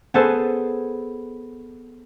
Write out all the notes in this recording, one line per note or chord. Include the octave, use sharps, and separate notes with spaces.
B3 G#4 A4 C5